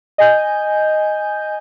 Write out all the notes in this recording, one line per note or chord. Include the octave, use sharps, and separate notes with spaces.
D#5 G#5 G6